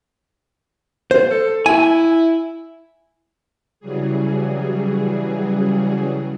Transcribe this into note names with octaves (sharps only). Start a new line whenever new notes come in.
C5
A4
E4 G#5
C#3 E3 F#3 G3 G#4